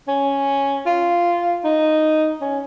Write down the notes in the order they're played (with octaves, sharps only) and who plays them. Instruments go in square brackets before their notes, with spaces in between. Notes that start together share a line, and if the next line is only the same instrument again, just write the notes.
[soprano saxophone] C#4
F4
D#4
C#4